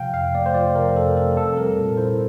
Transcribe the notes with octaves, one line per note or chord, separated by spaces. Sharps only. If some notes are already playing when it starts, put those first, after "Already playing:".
Already playing: C3 F3 F5 G5
F2 F5
A3 D5
C5
F3 D5
C3 A#4
F2 A4
A3 A4
C4 A4
G3 A#4
A#2
E4 C5